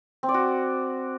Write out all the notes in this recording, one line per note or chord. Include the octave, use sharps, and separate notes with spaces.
C4
D5
F#4